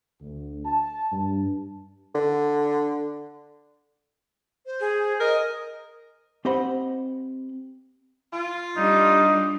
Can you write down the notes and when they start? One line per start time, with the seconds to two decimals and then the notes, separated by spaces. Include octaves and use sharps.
0.20 D2
0.65 A5
1.11 G2
2.15 D3
4.66 C5
4.80 G#4
5.20 A#4 D#5
6.45 C4 G4 C5 D#5 F#5 B5
8.33 F4
8.77 G3 D4 D#4